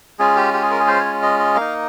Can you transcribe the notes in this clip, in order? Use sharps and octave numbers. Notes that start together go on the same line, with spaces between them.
G#3 C#4 F4 G#4
G4
G4
G#4
A#4
G#4
C5
C#5
D#5
D#5
A#3 D#4 F5